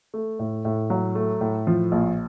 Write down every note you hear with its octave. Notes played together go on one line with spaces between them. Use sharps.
A3
A2
A2
F#3
A3
A2
F3
A#1